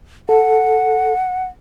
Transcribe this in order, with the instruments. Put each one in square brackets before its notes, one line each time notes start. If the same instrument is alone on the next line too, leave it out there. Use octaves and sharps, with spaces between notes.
[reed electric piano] A4 [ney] F#5